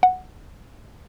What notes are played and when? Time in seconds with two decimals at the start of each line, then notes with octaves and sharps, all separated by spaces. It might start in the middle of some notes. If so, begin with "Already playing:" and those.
0.03 F#5